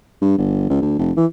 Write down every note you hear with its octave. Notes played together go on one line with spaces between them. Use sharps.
G2
G1
C#2
D2
F1
E3